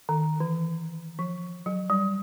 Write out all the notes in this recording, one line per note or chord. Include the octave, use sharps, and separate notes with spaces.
D#3
E3
F3
F#3
G3